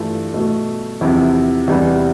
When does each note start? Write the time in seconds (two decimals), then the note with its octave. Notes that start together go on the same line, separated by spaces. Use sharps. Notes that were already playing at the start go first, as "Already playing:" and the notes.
Already playing: G2 E3 A3 F4
0.34 B2 A3
1.01 E2 C3 F3 E4
1.68 E2 C3 G3 B3